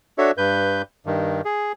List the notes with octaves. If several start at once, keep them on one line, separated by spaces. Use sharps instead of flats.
D4 F#4 A4 C#5 E5
G2 B4 G6
G2 D#3
G#4